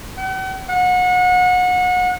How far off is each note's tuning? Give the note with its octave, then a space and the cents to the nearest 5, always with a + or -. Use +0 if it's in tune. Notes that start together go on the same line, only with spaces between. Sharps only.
F#5 +45
F#5 -30